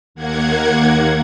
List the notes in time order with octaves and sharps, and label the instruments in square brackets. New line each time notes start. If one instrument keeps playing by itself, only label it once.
[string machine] D#2 A#3 F#5 G#6